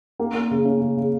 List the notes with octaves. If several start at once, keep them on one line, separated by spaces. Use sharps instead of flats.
A#3
A#3
C#3
C#4
C#3
C#3